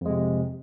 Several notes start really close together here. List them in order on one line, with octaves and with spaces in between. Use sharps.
F2 G#3 C3